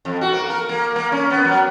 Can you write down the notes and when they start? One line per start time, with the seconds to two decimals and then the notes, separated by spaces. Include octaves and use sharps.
0.05 F2
0.21 F#4
0.32 A#3
0.50 A#4
0.69 A#3
0.96 A#3
1.12 C#4
1.30 B3
1.45 F#3